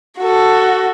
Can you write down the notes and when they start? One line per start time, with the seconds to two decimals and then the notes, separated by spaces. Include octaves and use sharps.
0.19 F#4 A4